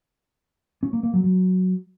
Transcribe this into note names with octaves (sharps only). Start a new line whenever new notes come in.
C#4
A#3
A#3
F#3
F#3